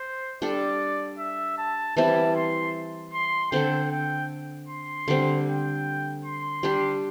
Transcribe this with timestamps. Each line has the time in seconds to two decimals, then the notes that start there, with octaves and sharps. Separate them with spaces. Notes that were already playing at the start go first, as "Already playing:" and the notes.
Already playing: C5
0.42 G3 D4 A4 D5
1.19 E5
1.58 A5
1.97 E3 G3 C4 E4 A5
2.36 C6
3.13 C6
3.52 D3 C4 A4 G5
3.91 G5
4.68 C6
5.08 D3 G3 C4
5.47 G5
6.24 C6
6.63 G3 D4 G4